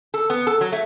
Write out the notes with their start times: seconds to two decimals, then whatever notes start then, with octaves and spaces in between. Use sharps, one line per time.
0.14 A4
0.30 B3
0.47 A4
0.61 F#3
0.72 A3